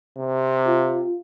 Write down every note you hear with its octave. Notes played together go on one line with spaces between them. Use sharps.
C3
F4